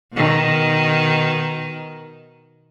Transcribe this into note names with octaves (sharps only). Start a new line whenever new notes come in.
B2 D#3